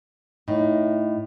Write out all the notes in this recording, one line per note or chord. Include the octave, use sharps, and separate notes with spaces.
A2 D#4